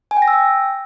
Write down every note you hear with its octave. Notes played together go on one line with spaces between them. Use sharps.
G#5
G5
A#6
E6
G5